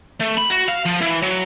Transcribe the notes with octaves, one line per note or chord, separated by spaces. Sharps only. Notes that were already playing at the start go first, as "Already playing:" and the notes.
A3
B5
F#4
F5
F3
E3
F#3